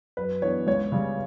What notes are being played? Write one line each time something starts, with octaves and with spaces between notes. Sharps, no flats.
F#2 B4
E3 B3 D4 C#5
C#2 C#5
C#3 G3